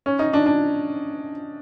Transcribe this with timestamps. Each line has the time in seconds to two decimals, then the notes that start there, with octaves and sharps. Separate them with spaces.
0.06 C#4
0.19 D#4
0.33 D4
0.46 D4